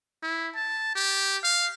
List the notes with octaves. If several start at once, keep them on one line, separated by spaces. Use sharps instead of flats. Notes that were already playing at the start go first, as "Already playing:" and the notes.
E4
A5
G4
F5